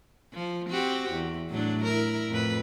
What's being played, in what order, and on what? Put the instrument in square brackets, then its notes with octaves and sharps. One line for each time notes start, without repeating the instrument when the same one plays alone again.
[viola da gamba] F3
C4 F#4 G4
E2
A2 F#3 D4
E4 A#4
F2 A2 B4